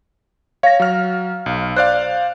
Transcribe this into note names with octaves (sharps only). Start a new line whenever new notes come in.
C#5 F5 A#6
F#3 F6
B1
C5 D5 F5 F#6